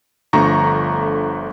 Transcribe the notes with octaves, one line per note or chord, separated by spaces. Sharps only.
G1 D3 F3 A3 A#5 C#6